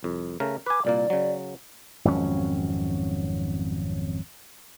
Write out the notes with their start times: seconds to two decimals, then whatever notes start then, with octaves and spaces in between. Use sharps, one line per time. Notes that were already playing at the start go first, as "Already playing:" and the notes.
0.03 C2 F2
0.40 C#3 A3 A#4
0.66 B4 G#5 D6
0.85 C2 A#2 A#3 D5
1.10 C#3 F#3
2.05 G#1 F2 F#3 C#4